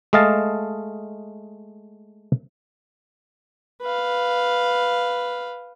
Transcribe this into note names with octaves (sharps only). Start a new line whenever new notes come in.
G#3 A3 D#5 F5 A5
B4 F5